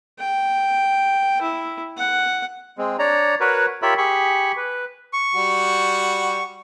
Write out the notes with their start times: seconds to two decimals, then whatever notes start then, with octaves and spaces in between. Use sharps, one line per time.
0.19 G5
1.42 E4
1.98 F#5
2.78 G#3 C4
2.99 D4 C#5 D5 A#5
3.40 F#4 A#4 B4 C#5
3.82 F4 G4 A#4 C#5 E5 B5
3.98 G4 G#4 B5 C#6
4.57 B4
5.13 C#6
5.34 G3 F#4